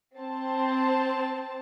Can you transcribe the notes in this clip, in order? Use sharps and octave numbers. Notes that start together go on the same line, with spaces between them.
C4 A5